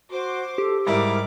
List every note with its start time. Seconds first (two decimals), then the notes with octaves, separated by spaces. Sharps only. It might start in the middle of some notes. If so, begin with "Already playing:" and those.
0.10 F#4 C5 C6 D6
0.58 G4 A4
0.87 G#2 G3 E4 A#4 D6